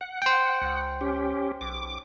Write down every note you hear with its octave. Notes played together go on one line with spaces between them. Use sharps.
F#5
C5 G5
C#2
C#4 G4
B1 D6